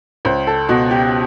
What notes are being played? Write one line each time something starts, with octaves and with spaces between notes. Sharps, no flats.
C#2 C5
A4
B2 F#4
G4